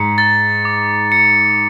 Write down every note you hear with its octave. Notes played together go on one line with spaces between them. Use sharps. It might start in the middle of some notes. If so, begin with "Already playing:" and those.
Already playing: G#2 C#7
A6
D6
C#7